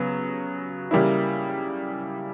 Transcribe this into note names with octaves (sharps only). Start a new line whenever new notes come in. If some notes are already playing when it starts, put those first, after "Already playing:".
Already playing: C#3 F#3 B3
C#3 G3 A#3 E4